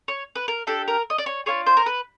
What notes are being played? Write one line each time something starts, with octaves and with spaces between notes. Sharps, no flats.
C#5
B4
A#4
D4 G4 A4
A#4
D#5
D5
C#5
D4 F4 G#4 C#5
C5
A#4
B4